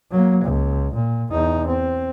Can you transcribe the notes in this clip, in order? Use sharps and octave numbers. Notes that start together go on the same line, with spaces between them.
F#3 A#3
C#2
A#2
E2 D#4
C4